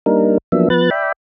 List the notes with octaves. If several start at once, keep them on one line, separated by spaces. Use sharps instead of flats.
G3 A#3 D4 D#4 A#4
F3 F#3 A#3 B3 D4 E5
F3 B3 B4 F#6 A6
D5 E5 G5 B5